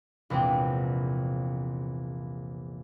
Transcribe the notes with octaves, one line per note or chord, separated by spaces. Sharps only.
A#1 E2 C3 G#3 C4